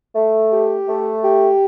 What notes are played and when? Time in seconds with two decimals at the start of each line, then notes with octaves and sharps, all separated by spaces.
0.15 A3
0.51 G4
0.88 A3
1.24 G4